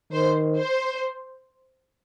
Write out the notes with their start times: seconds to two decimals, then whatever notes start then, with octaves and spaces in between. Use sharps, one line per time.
0.12 D#3 C5
0.57 C5